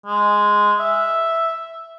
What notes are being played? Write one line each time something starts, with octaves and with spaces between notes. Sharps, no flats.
G#3
E5